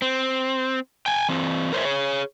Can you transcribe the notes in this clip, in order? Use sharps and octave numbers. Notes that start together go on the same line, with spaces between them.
C4
G5 G#5
E3 C4
A#4 C5 C#5 E5
G#4 C#5